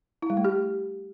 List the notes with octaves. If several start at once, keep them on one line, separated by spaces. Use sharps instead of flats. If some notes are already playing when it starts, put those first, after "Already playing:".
E4
G3
A3
G4